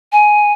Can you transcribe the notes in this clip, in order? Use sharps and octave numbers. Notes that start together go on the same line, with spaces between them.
G#5